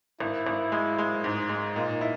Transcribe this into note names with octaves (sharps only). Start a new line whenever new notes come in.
G#1 E4
G#1
G#3
G#3
G#2
G#3
A#2 D#4
E4